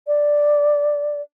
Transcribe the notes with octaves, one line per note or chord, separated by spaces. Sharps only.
D5